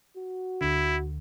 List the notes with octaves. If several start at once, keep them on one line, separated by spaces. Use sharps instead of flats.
F#4
D2 D3 E4